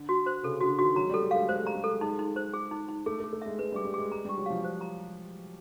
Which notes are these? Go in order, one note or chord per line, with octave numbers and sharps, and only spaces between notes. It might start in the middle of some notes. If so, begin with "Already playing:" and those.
Already playing: D3
F#4
C5
C#3 A4
D3 F#4
D#3 F#4
F#3 A#5
G#3
G3
A4
G#3
A3 F5
G#3 C5
G3 A#5
G#3
A4
G#3 D#4
D#4
C5
G#4
D#4
D#4
A3 G#4
A3
G#4
A3
G#3 E5
G#3 B4
G3
G#4
G3
G#3 G#4
G#3 A#5
G3 G4
F#3
F3 F5
C5
A#5